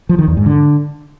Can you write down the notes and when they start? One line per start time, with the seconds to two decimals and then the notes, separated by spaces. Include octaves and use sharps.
0.09 F3
0.19 D#3
0.28 E2
0.37 G#2
0.46 D3